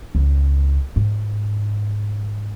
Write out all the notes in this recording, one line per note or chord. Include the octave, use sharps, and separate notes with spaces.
C#2
G#2